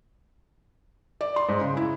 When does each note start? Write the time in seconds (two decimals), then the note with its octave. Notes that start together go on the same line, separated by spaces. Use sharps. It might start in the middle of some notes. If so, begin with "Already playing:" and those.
1.21 D5
1.36 C6
1.49 G#2
1.61 C#3
1.77 E4